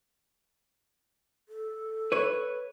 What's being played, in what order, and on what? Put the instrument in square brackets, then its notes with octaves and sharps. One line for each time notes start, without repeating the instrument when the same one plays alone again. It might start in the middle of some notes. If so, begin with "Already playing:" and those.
[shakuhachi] A4
[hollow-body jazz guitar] B4 C#5